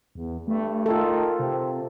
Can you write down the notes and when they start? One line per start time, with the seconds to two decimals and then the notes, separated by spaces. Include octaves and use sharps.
0.15 E2
0.48 G2 A3
0.86 D#3 F4 A4
1.39 C3 C4